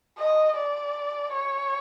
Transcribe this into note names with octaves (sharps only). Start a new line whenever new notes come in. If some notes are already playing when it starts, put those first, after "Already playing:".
D#5
D5
C#5